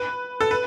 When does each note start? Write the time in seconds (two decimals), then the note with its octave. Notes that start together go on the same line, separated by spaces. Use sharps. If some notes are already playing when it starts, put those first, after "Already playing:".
Already playing: B4
0.41 A4
0.51 B4